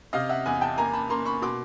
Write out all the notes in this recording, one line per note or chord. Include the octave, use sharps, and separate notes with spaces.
C3 D#5 F5
E5 F#5
E2 F#5 G#5
G5 A5
A#3 G#5 A#5
A5 B5
A#3 A#5 C6
B5 C#6
B2 C6 D6